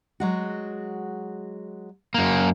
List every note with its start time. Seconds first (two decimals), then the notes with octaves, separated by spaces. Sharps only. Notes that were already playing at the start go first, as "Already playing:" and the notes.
0.20 F#3 G#3 F#4
2.14 F#2 A#3